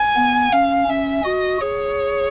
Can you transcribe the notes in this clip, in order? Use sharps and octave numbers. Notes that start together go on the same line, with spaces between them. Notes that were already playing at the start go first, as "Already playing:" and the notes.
Already playing: G#5
B3
C#4 F5
C#4 E5
F#4 D#5
G#4 C#5